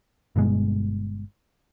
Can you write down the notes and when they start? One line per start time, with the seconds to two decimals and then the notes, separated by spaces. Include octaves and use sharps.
0.36 G1 G2 B2 G#3